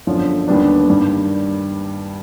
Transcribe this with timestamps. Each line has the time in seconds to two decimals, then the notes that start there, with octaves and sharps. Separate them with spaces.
0.07 G1 F#2 D3 F3
0.48 D#2 D3 G3 B3 D4
0.89 G2 D#3 G3